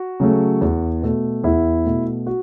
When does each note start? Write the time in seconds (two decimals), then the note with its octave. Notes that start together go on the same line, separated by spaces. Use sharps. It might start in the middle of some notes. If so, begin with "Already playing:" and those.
Already playing: F#4
0.20 C#3 F#3 A3
0.61 E2
1.02 B2 A3
1.44 E2 E4
1.85 B2 A3
2.27 F#4